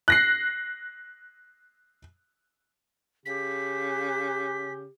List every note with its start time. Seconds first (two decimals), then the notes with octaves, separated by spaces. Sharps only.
0.08 F#6 A#6 C7
3.26 C#3 G4 B6